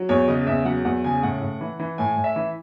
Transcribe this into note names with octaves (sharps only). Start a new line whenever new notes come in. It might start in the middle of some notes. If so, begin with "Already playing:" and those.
Already playing: F#3
E2 C#5
C#3 D#5
E2 E5
F#3 F#5
E2 F#5
C#3 G#5
A2 F#5
A2
E3
E3
A2 G#5
A2
E5
E3